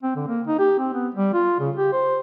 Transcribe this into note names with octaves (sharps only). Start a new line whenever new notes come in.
C4
D3
A#3
D#4
G4
C4
B3
G3
F4
C#3
G4
C5